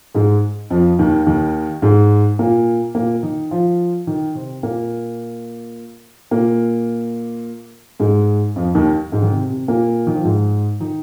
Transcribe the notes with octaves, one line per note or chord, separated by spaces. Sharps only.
G#2 G#3
F2 F3
D#2 D#3
D#2 D#3
G#2 G#3
A#2 A#3
A#2 A#3
D#3 D#4
F3 F4
D#3 D#4
C3 C4
A#2 A#3
A#2 A#3
G#2 G#3
F2 F3
D#2 D#3
G#2 G#3
D#3
C3
C3
A#2 A#3
D#3
F3
G#2 G#3
D#3 D#4